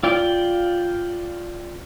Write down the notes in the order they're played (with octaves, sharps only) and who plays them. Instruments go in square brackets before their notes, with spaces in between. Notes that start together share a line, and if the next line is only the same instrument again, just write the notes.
[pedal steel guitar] F4 D5 G5